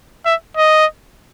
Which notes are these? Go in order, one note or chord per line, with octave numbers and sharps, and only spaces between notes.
E5
D#5